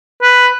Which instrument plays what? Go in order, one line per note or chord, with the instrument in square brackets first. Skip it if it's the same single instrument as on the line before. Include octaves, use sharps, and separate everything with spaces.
[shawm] B4